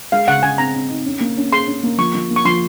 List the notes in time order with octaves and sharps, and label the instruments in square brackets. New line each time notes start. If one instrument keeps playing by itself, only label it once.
[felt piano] G#3 [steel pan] F5
[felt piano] C#3 [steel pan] F#5
[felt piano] C#3 [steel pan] G#5
[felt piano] C4 [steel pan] A#5
[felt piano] C4
D#4
C#4
A#3
C#4
[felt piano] G#4 [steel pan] C6
[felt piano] C#4
A#3
[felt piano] F3 [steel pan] C#6
[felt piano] F3
A#3
[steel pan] C#6
[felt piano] F3 [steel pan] C6